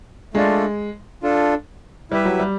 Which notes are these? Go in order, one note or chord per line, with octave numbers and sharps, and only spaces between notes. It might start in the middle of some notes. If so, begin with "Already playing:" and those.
G#3 A3 D4 F4 A4 D5
D4 F4 A4
G3 E4 G4 B4 E5
F#3
G3